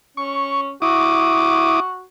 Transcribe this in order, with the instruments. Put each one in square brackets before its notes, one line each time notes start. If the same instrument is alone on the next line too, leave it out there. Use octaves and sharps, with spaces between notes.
[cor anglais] C#4 [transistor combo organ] C#6
[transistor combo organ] E4 D6 D#6 [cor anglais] F#4